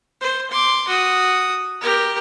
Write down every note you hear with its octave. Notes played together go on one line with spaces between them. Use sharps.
C5
C6 D6
F#4 D#6
G4 A#4